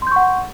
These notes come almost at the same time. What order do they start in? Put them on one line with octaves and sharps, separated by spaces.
C6 G6 C#6 F#5